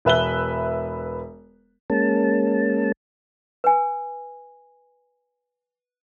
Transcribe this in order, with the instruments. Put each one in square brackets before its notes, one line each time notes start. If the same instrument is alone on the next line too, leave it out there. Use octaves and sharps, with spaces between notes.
[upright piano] E1 B4 E5 F#6 G7
[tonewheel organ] G#3 A#3 C#4 A5
[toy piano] B4 G#5